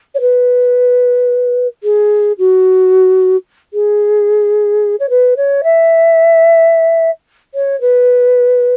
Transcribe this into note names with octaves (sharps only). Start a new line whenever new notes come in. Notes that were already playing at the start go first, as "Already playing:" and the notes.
C#5
B4
G#4
F#4
G#4
C#5
B4
C#5
E5
C#5
B4